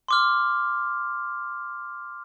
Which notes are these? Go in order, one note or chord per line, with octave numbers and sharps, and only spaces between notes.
C6 D6 F6